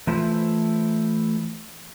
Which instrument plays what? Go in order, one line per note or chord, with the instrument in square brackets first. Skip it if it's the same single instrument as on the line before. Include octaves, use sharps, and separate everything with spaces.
[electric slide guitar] E3 A3 E4 F4 C5